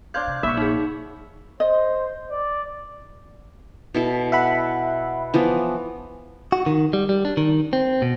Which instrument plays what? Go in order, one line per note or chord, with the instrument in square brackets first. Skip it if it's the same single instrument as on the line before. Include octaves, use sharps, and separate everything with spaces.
[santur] D4 C5 F5 [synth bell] G6 G#6
[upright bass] C3
[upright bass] A#1 [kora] E5 [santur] B5 C#6
[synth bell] D#4 G#4
[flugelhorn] C5 [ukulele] D#5
[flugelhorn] D5
[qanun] B2 E4 A4
[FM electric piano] E5 F#5 B5
[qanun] E3 F3 B3
[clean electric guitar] F#4
D#3
G3
G3
D4
D#3
C4
B2